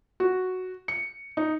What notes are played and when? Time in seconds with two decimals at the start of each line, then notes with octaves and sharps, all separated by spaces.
0.20 F#4
0.88 C#7
1.37 D#4